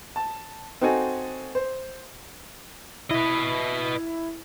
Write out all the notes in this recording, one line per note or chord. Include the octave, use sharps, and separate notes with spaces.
A5
C4 D#4 F#4 A4 G#5
C5
E4 B4 D#5